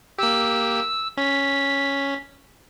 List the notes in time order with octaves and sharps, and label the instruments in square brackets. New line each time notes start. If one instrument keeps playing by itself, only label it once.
[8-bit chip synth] A#3 G4 [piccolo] E6
[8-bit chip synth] C#4 [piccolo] B6